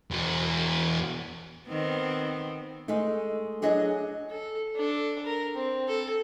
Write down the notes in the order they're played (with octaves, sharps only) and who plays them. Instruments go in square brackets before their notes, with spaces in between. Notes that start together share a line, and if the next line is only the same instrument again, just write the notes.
[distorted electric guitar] E2 F#4
[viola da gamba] D#3 B3 C4
[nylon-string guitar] G#3 A3 D#4
F#3 D4 G#4 D#5
[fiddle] A4
D4 A4
A#4
C4
A4